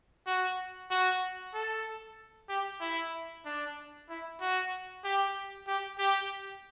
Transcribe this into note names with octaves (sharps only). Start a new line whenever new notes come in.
F#4
F#4
A4
G4
E4
D4
E4
F#4
G4
G4
G4